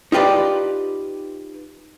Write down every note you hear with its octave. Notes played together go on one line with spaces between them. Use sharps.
D#4 F4 G4 B4 D5